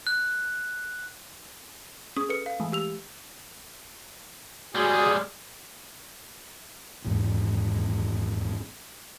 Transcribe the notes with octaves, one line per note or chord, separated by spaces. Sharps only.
F#6
C#4 G#4 D#6
A4 B4 C#7
F5
E3 G#3 A3
G4 E6 F7
G3 G#3 F#4 G#4
D#1 G#1 E2 G#2